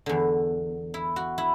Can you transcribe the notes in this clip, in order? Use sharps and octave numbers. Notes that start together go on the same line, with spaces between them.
E2 D3
E4
F#4
E4